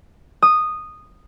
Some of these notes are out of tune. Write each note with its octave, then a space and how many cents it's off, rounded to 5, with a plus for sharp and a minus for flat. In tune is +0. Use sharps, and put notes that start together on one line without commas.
D#6 -10